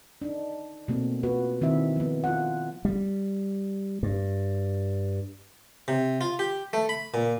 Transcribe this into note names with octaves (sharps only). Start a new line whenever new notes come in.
D4 D#4
B2 A3 A#3 C4
B3 F4 F#4 B4
D#3 C4 E4 E5
F3 B3
F4 F#5
G3
G2
C3
F4
G4
A3
B5
A#2